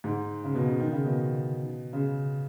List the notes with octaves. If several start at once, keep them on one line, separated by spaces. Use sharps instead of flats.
G#2
C#3
B2
C#3
D#3
C#3
B2
C#3